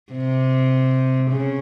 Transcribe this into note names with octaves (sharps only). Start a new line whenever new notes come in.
C3
C#3